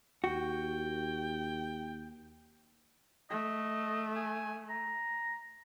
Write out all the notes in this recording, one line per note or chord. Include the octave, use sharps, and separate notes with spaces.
D#2 F#4 G5
A3 D#5
G#5
A#5